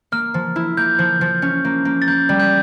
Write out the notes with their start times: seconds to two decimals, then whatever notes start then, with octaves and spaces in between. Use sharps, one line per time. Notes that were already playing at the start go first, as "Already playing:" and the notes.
0.12 A#3 F6
0.34 F3
0.56 E4
0.77 A#3 G6
0.99 F3
1.21 F3
1.42 C#4
1.65 A#3
1.85 A#3
2.02 A6
2.08 A#3 G6
2.29 G3
2.40 G6